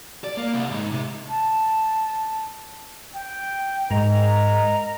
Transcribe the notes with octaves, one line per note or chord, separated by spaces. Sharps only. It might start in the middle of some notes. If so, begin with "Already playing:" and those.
D5
A#3
C2
G#2
C3
A5
G5
G#2 A#4 D#5 A#5